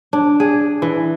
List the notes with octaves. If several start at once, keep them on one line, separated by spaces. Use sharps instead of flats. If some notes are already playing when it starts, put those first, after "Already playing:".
D4
G#4
E3